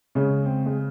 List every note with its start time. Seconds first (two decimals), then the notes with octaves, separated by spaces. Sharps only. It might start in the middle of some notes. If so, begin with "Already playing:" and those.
0.15 C#3 G#3 C#4
0.45 C4
0.66 G#3